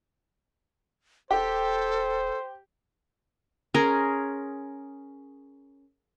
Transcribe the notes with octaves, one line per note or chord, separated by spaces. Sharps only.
D#1 G4 A4 C5
C#4 G#4 A#4 C6